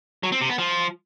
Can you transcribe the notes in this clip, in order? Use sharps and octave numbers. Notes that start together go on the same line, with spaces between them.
F#3
C4
C3
B3
F3